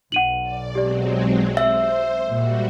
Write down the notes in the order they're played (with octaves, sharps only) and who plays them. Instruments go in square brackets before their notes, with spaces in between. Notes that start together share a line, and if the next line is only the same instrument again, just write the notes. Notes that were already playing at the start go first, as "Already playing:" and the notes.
[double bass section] B1 [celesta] F#5 D#7 F#7
[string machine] D5
[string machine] F#3 G#3 C4 [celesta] G4 D5
[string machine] C5 [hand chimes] E5
[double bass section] A#2 G#3 [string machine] G3 F#4